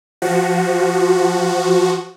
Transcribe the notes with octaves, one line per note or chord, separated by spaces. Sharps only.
F3 F#4